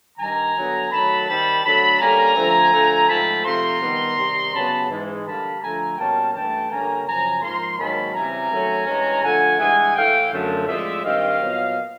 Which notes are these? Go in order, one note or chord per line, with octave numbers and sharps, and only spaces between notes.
G2 D#3 G3 G#5 A#5
D3 F#3 B3
D#3 F#3 A3 A5 B5
D#3 G3 C4 A5 B5
D3 F#3 A3 A5 B5
D3 G3 A#3 C#4 G#5 A#5
D3 F3 A3 C4
D3 F3 A3
G#2 F3 A3 C4 A5 B5
C3 F3 A3 C4 A#5 C6
D#3 G3 B3
C3 D#3 G3
C#3 F#3 B3 A5 B5
G#2 E3 G#3
D3 G3 A#3 A5 B5
D3 F3 A3 G#5 A#5
B2 G3 A#3 C#4 G5 A5
G2 E3 A3 G5 A5
D3 G3 A#3 C#4 G#5 A#5
F#2 C#3 F3 G#5 A#5
G#2 F3 A#3 A#5 C6
G#2 D#3 F#3 A#3 C#4 A5 B5
C#3 E3 G3 C4 G#5 A#5
D#3 F#3 A3 C#4
G2 E3 G#3 C#4
D3 F3 A3 F#5 G#5
G2 E3 G#3 F#5 G#5
A2 E3 A3 F5 G5
F#2 D3 F3 A3
A2 F3 G#3 C4 D5 E5
G2 D#3 G3 C4 D#5 F5
A#2 F#3 B3